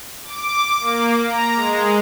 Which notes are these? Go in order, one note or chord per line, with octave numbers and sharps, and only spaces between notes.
D6
A#3
A#5
G#3